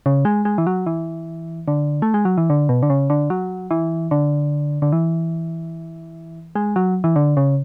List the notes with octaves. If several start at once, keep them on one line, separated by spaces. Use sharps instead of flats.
C#3
G#3
G#3
E3
F#3
E3
D3
A3
G#3
F#3
E3
D3
B2
D3
C#3
D3
F#3
E3
D3
D3
E3
G#3
F#3
E3
D3
C#3